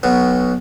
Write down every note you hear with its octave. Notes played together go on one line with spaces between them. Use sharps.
B1 B2